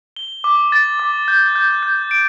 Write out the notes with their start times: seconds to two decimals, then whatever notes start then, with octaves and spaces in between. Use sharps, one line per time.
0.16 G7
0.44 D6
0.72 A6
1.00 D6
1.28 G6
1.55 G6
1.83 G6
2.11 D7